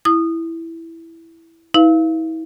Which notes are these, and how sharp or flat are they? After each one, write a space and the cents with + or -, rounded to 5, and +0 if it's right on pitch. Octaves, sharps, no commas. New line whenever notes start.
E4 +0 D#6 -20
E4 -40 B4 -5 F5 -25